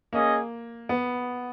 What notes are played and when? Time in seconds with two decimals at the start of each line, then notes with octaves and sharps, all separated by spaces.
0.12 A#3 C#4 G#4 D#5
0.89 B3